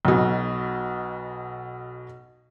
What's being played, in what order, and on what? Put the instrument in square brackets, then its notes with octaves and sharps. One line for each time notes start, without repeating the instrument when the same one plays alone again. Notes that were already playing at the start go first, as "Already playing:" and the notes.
[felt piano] B1 B2